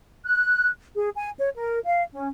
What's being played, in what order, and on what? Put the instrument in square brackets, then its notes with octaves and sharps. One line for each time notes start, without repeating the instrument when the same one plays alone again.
[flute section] F#6
G#4
G#5
C#5
A#4
F5
C#4